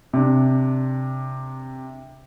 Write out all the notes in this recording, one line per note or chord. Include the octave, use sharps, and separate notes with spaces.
C3 D4